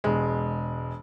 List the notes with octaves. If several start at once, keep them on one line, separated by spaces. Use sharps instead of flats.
E1 G#3